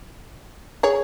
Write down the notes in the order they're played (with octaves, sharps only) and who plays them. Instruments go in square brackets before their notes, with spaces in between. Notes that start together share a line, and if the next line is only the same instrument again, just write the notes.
[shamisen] G#4 C#5